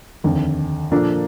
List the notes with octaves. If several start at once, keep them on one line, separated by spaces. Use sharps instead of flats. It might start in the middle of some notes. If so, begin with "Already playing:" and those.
F1 D#2 D3
A#2 F3 A#3 D4 A4